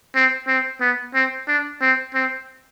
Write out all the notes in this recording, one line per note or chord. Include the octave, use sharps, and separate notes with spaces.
C4
C4
B3
C4
D4
C4
C4